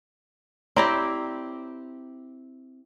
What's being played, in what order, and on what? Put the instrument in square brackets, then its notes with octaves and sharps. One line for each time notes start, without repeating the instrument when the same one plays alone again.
[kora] C4 E4 G4 [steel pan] C#5 D5 A#5